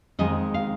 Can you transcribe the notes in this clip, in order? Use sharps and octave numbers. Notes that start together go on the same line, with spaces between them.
F2 D#3 G#3 D#5
F5